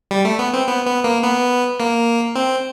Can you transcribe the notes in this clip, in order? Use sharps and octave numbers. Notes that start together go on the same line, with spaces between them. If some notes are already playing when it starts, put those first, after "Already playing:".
G3
A3
B3
C4
B3
B3
A#3
B3
A#3
C4